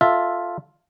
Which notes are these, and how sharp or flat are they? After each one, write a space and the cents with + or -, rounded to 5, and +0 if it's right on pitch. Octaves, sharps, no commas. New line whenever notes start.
F4 +5 A4 +0 E5 +0